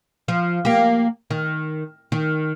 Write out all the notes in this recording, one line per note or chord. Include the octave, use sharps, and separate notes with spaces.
F3
A#3 G4
D#3
D#3